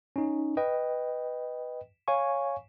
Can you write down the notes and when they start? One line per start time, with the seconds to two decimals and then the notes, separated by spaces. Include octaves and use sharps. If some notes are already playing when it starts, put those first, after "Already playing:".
0.16 C#4 D#4
0.57 B4 D#5 G5
2.08 C#5 F5 G#5 C#6